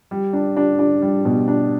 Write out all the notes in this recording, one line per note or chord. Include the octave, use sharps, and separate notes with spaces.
G3
D4
D4
D4
G3
B2
D4